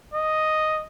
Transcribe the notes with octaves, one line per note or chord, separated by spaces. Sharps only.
D#5